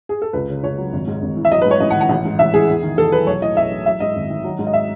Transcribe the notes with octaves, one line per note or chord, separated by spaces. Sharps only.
G#4
A4
C#2 B4
C#3
C#2 C#5
F#3
G#1
G#2
G#1
E3
E5
F#3 D#5
B4
G#2
C#5
A1 D#5
F#5
D#3
F#5
A1
G#2
A1 E5
E3 G#4
E2
D#3
E2 A4
F#3 B4
B1 C#5
A2 D#5
B1 E5
E3
F#3 E5
G#2 D#5
G#1
D#3
F#3
G#2
D#5
E5